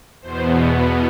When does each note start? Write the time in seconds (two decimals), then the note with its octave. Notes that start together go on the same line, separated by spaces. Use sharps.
0.22 E2 B2 B3 C5